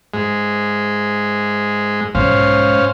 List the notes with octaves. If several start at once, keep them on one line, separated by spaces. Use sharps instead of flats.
G#2 G#3
B1 G#2 C#4 C5 F5